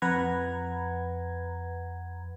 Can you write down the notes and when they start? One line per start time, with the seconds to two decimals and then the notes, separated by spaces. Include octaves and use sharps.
0.02 F2 B4 F#5 A#5 G#6